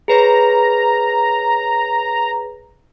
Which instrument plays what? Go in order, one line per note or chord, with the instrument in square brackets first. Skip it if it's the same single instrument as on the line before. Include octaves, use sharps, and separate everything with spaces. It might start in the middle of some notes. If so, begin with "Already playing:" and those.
[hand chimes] G#4 B4 C#5 [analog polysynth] A#5